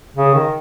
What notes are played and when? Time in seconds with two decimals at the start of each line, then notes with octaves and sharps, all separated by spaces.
0.17 C#3
0.34 D#3